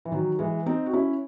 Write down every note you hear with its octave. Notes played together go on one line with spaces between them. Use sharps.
E3
D#3 F#3
E3 G#3
C4 D#4
F#4
C#4 E4